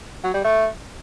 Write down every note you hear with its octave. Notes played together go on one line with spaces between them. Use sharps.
F#3
G3
A3